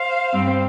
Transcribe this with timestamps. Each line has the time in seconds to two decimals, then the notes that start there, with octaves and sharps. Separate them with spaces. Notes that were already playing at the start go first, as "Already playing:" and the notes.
Already playing: C5 F5
0.33 G2 G3 C4